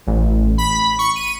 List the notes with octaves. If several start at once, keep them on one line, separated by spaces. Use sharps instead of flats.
A1
B5
C#6
D#7